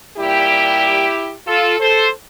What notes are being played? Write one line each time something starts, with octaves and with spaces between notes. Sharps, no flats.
A#2 G3 E4 G4
F4 A4
A4 C5